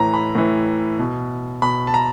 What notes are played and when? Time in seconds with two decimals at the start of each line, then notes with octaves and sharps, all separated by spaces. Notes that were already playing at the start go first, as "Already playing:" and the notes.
Already playing: A2 E3 A#5
0.14 B5
0.35 A2 E3
0.99 B2
1.62 B2 B5
1.87 A5
1.94 A#5